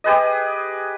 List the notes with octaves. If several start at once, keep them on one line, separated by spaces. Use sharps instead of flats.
G4 G#4 B4 D#5